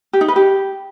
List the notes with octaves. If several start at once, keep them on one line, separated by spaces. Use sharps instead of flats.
G4
D#4
B4
G4